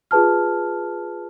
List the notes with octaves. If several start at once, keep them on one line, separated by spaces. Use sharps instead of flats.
F4 G#4 B4 A5 F6